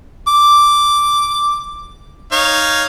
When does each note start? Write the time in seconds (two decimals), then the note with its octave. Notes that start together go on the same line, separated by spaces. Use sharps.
0.28 D6
2.32 D#4 C#5 F5